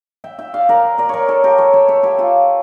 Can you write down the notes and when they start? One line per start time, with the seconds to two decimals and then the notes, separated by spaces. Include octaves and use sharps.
0.24 E5 G5
0.39 E5 G5
0.54 D5 F5
0.69 A#4 D5
0.98 A#4 D5
1.09 A#4 C#5 D5
1.28 A4 C#5
1.44 G4 A#4
1.58 A4 C#5
1.73 A4 C#5
1.88 C#5 E5
2.03 E4 G4
2.18 F4 A4